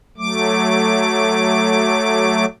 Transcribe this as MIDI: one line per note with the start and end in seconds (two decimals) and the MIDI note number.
0.18 2.45 54
0.18 2.45 57
0.18 2.45 86